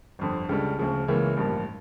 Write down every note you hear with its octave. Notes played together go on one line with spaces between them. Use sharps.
G1 F2 D3
C#2 C#3 G3 D4 A4
D2 C#3 F3
C#2 C#3 E3 A#3 C#4
A1 G2 F3 A#3